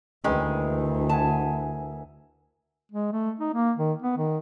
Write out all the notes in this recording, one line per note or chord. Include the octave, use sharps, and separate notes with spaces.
D2 D#3 E3 G#3 C#4
E5 F#5 G#5 A5
G#3
A3
D#4
A#3
D#3
B3
D#3